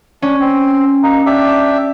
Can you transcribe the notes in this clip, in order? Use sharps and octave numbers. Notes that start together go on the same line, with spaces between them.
C#4 D4
C4
A#3 D#4
D4 G4 E5